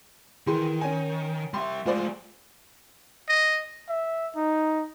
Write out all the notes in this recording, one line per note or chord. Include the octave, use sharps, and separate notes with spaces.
D#3 E3 G#4 C6
C#4 G#5
G3 E5 C6
G#3 A3 F4 C5 D5
D#5
E5
D#4